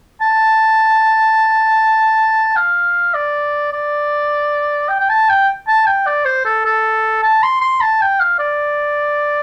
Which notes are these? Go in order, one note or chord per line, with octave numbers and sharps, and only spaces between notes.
A5
F5
D5
D5
G5
G5
A5
G5
A5
G5
D5
C5
A4
A4
A5
C6
C6
A5
G5
F5
D5